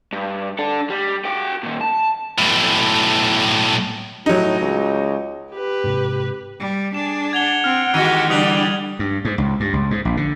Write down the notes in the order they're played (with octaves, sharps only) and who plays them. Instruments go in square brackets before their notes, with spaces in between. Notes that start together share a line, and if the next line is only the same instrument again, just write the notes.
[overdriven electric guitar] G2
D4 A4
G3
F#4 G5
A#2 D#3
A5
[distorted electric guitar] B1 A2
[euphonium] A2 [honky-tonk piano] F#3 D#4
[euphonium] C#2
[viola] G4 B4
[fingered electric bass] G#2 C3
[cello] G3
[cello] D4 G#4 [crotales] E7
[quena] F#5 [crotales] G#6 F7 G7
[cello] C4 [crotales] F6
[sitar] D#3 E3 G#3 [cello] F#4 G4 [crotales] F6 G#6 D#7
[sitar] D3 E3 B4 [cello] G3 [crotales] D#6 F7 G7
[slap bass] G2
G#2
C#2
G2
C#2
G#2
A#1
D3